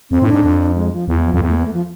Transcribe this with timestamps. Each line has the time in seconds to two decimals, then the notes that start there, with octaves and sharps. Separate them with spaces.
0.11 F2 C4
0.22 A2
0.27 D4
0.33 G#2
0.44 F2
0.76 G#3
0.92 F3
1.08 E2 E3
1.19 G#3
1.24 F3
1.34 F2
1.41 E2
1.49 A3
1.57 B3
1.65 A3
1.73 F3